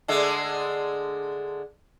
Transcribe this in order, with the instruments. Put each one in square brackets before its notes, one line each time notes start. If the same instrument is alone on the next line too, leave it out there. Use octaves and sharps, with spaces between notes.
[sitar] D3 G#3 A3